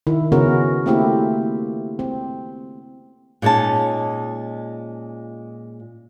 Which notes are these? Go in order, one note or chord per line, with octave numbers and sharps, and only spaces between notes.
D#3 E4
C#3 B3 C#4 F#4 A#4
A3 A#3 C4 E4 G4
C4
A#2 G#3 C#4 D#4 A5